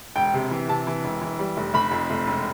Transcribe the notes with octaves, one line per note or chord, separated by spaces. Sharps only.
E1 G5
C3
E3
C3 A5
E3
E1
E3
G3
F1
F1 B5
F2
F1
E1